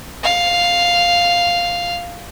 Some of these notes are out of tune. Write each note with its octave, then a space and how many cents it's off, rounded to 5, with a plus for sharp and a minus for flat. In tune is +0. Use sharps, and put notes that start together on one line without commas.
F5 +0